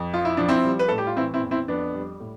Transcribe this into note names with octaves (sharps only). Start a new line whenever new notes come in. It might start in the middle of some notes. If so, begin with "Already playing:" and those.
Already playing: F2
F3 F4
E4
F3 D4
C4 E4
G3
B4
A2 A4
G4
F4
E3 C4 E4
C4 E4
E2
C4 E4
F2 B3 D4
G3
A2